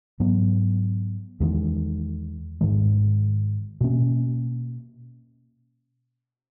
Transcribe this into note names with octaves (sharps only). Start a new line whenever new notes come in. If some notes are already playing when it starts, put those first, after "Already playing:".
G#2 F#3 B3
E2 D#3 G#3
G#2 D#3 G#3
B2 A#3 C#4